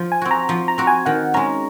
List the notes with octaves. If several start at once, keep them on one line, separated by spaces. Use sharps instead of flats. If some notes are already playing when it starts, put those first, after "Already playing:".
Already playing: F3
G#5
C4 F#4
A#5
F3
A#5
C4 F#4
G#5
D#3 F#5
G#3 C#4 A#5